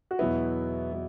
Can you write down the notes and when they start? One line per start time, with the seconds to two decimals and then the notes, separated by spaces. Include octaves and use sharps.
0.11 F#4
0.19 E2 B2 F#3 B3 E4
0.92 B2 F#3 B3